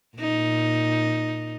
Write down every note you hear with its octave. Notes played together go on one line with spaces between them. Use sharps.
A#2 D#4